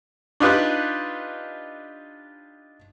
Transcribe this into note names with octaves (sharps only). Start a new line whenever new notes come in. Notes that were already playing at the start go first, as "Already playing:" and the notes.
D4 D#4 F4 G4 B4